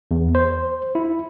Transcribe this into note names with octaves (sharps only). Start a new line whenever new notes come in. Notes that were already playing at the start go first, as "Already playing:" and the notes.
E2
C5
E4